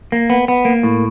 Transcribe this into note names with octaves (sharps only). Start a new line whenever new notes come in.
A#3
B3
B3
A#3
A2